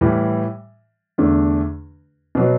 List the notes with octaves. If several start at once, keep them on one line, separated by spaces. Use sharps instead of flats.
A2 E3 G3
E2 D3 A3 D4
B2 F#3 B3 F#4